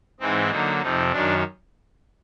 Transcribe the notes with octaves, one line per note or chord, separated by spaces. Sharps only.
G#2 E3 G#3 C4 D#4
D3 F#3 A#3 D#4
F2 C3 F3 D#4
F#2 D#3 F#3 D4